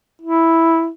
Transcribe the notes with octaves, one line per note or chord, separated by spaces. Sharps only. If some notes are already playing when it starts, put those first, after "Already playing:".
E4